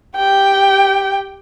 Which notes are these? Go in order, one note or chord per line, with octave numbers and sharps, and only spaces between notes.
G4 G5